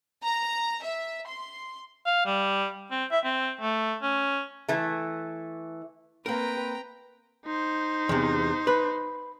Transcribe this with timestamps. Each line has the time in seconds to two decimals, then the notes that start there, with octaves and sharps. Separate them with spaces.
0.23 A#5
0.83 E5
1.27 C6
2.06 F5
2.26 G3
2.91 C4
3.12 E5
3.25 C4
3.61 A3
4.02 C#4
4.68 E3 A3
6.26 A#3 C4 A#4 B4 G5 A#5
7.45 D#4 C5
8.09 E2 C3
8.67 B4